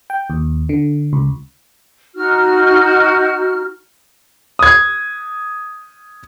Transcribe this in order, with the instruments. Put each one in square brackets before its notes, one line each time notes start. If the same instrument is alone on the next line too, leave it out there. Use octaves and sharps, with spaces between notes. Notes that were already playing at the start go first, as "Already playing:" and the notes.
[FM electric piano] G5
D#2
D3
C#2
[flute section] D#4 F#4 F6
[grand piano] D#6 G#6